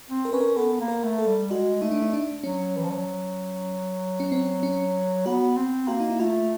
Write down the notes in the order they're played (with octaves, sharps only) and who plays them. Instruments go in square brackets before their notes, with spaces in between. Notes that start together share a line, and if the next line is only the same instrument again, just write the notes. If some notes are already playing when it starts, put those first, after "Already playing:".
[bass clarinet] C4
[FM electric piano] A#4
[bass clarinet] C#4 [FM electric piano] B4
[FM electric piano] A#4
[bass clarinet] B3 [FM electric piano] A4
[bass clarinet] A#3
[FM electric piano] A#4
[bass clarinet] A3
[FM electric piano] A4
[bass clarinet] G3
[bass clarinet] G#3 [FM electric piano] F#4
[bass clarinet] A3 [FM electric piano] D#4
[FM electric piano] D4
D#4
D4
[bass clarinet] F#3 [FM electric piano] C#4
[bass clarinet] E3
F3
F#3
[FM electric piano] C#4
C4
C#4
[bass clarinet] B3 [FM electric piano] F#4
[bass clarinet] C4
[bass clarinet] A#3 [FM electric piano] F#4
[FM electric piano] D#4
E4
[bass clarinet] A3 [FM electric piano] F4